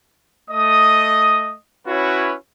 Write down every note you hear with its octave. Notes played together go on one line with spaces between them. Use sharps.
A3 D#5 D#6
C#4 E4 F#4 B4 C#5